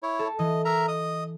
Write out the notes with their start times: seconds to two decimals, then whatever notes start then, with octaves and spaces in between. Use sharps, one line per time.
0.03 E4 C#5
0.19 A4
0.39 E3 D#5
0.65 A#4 E5 A#5
0.88 D#5 D#6